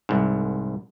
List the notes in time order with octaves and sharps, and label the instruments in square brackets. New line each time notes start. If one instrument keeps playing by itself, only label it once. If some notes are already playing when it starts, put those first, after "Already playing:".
[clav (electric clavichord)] C2 G#2